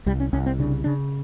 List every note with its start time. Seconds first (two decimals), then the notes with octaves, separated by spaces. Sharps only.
0.06 C2 G3
0.20 C#4
0.33 C2 C#4
0.46 C4
0.59 C#3 D4
0.84 C#3 D4